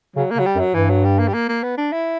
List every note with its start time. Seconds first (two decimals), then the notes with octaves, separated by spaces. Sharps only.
0.16 C#3 F#3
0.31 C#3 A#3
0.39 F#3
0.46 G3
0.55 F#2
0.60 F#3
0.74 G2 E3
0.90 F#3
1.05 G3
1.19 A#3
1.28 G3
1.34 A#3
1.49 A#3
1.63 B3
1.77 D4
1.92 E4